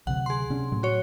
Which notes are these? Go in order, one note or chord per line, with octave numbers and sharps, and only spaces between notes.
D2 C3 F#3 F#5
G#4 C6
C3 C#4 D4
A2 F#3
F#4 C#5